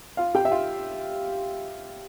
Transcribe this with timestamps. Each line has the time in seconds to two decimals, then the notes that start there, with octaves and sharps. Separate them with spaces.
0.17 F4 F5
0.35 G4 G5
0.45 E5
0.51 F4 F5